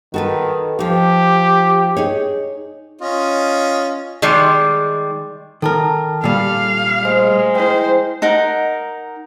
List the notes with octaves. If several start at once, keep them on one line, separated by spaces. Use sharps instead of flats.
D#3 F#4 A4 B4
F3 D#4 G4
D#4 G#4 C#5
C#4 F4 D#5
D#3 G3 G#3
D#3 A4 A#4 A5 F6
A#2 G3 F5
G#3 A3 C5
E4 C5 G5
D#4 A#4 F#5